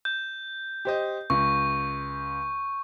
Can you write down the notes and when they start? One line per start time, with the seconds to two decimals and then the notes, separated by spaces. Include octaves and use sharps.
0.05 G6
0.85 G4 C5 D#5
1.30 C#2 C#6